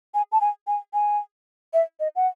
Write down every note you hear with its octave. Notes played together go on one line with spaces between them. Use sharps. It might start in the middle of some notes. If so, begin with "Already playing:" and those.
G#5
A5
G#5
G#5
G#5
E5
D#5
F#5